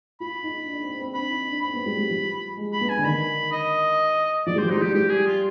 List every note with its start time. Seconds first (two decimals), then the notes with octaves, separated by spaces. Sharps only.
0.20 F4 B5
0.43 D#4
0.67 D4
0.83 C4
0.99 C4
1.14 D4 B5
1.30 D#4
1.46 D4
1.62 C4 B5
1.73 B3
1.86 G3
1.98 G3
2.10 F3
2.57 G#3
2.73 B5
2.81 B3
2.89 G#5
2.97 D3
3.05 D#3 B5
3.52 D#5
4.46 F3 D5
4.56 G3 C5
4.63 F3
4.70 G3 D#4
4.81 F3 G4
4.94 G3 G4
5.09 G#4
5.26 F4